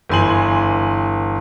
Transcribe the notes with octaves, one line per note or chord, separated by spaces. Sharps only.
G1 E3 G#5 C6 F#7